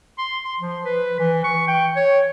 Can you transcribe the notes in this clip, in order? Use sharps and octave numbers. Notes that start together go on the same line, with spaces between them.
C6
C6
F3
B4
E3
C#6
G5
C#5